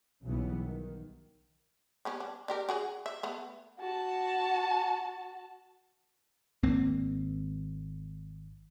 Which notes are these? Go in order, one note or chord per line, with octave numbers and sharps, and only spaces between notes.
B1 C#3 E3 G3 B3
D#3
G3 B3 C#4
D4
D4 G4 A#4
F#4 G#4 F#5
E5
A3 B3
F#4 A5
G#1 A#3 C4